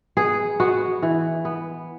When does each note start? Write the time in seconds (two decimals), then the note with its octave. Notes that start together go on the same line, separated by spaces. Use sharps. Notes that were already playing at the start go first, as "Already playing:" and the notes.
0.17 B3 G#4
0.60 B3 F#4
1.02 E3
1.45 B3